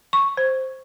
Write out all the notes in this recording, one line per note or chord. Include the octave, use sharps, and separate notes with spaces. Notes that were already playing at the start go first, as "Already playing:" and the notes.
C#6
C5